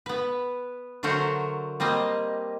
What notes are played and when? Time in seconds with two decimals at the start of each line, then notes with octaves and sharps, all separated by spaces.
0.06 B3 B4
1.03 D3 F#3 A3 F#4 A#4 C5
1.80 G3 A#3 C4 D#5